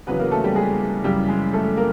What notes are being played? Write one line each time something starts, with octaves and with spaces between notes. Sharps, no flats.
E2 C#3 F#3 B3 B4
A#3 A#4
A3 A4
G3 G4
G#3 G#4
F#2 C#3 E3 G3 G4
G#3 G#4
A3 A4
A#3 A#4